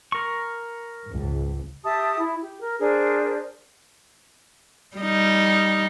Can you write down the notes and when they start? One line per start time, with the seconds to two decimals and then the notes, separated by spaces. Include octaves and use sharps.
0.12 A#4 C#6
1.09 C#2 G#2
1.84 G4 E5 A5 D#6
2.19 E4
2.41 G4
2.58 A#4
2.79 D4 G#4 A#4 C5
4.97 G3 D#4